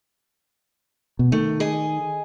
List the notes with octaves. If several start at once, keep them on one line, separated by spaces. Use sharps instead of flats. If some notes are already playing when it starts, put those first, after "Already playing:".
B2
D#3 A3
G#4 D#5